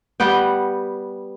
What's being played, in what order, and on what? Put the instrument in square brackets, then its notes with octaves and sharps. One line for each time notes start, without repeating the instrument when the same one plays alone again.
[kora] G3 B3 F#5 G5